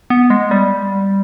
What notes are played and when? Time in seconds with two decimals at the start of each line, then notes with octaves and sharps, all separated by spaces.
0.10 B3
0.30 G#3
0.51 G3